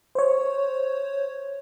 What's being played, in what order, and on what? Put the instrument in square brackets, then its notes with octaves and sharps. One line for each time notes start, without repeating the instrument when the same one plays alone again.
[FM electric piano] C5 C#5